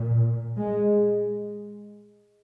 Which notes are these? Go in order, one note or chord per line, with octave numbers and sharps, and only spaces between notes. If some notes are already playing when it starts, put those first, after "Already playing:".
Already playing: A#2
G#3